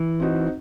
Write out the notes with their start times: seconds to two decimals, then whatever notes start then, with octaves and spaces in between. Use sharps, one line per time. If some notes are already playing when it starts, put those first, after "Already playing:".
Already playing: E3
0.20 C4 D#4 F#4